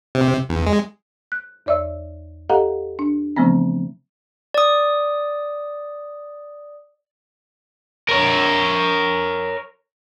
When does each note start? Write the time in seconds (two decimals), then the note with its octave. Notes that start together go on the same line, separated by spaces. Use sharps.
0.15 C3
0.49 E2
0.67 G#3
1.32 F#6
1.66 E2 C#5 D5 E5 E6
2.50 G4 A4 D#5 F5 F#5 A#5
2.99 D4
3.36 C#3 E3 F3 A3 B3 C4
4.54 D5 D#6
8.09 A#4 C#5